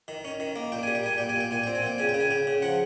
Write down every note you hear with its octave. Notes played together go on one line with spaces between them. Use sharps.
D#3
C#4
D#3
A#3
A#2 G5
G3 G#5
G5
G3 G#5
A#2 G5
G#5
A#2 G5
A#2 G#5
C4 G5
G#5
A#2 G5
C#3 G#5
G5
C#3
G#5
C#3 G5
C#3
F3 F#5